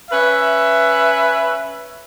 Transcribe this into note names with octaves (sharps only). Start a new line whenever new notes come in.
C#4 B4 E5